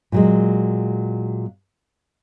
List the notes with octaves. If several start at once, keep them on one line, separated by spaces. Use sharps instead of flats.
A#2 F#3 G#3